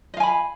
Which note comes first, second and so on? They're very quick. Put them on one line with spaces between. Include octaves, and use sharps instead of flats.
D#5 F5 G#5 B5